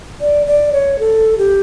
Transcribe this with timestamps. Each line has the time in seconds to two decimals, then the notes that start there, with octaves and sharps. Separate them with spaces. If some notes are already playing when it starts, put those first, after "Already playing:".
0.21 D5
0.46 D5
0.73 C#5
0.99 A4
1.38 G4